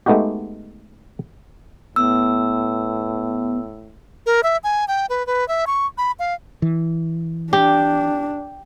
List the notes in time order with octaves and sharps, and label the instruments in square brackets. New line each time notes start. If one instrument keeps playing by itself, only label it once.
[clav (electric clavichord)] G#3 A3 B3 D#4 F#4 G4
[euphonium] A2 [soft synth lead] B3 [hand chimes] E6
[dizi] A#4
E5
G#5
G5
B4
B4
E5
C#6
B5
F5
[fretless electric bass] E3
[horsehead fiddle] D4 [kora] G4